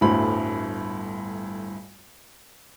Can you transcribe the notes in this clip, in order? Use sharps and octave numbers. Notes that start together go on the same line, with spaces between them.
G1 D2 A2 B5